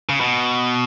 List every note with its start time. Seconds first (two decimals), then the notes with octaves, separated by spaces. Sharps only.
0.09 C#3
0.21 B2